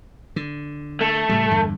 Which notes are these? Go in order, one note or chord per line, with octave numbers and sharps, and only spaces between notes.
D3
A3
A2 C#3 G3
E2 G2 D3